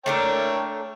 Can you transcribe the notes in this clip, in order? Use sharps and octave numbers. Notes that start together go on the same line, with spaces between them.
A3 D4 A#4 C#5 G5